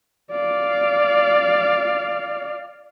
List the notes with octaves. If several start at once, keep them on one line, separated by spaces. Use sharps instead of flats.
D5 F5